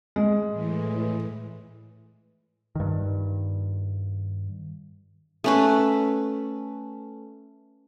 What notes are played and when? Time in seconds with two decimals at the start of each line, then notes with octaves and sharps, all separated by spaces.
0.16 G#3
0.50 A2 E3
2.75 G2 D#3
5.44 A3 C#4 B4